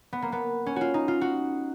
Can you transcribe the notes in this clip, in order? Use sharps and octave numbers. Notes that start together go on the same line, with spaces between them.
B3
A#3
B3
C#4
F4 F#4
D#4
F4
F#4